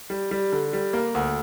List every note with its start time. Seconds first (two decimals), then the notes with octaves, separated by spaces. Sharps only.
0.10 G3
0.31 G3
0.52 D3
0.73 G3
0.93 A#3
1.14 D2